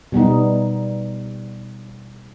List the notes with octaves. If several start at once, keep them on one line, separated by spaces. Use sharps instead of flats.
B2 G3 B3 D#4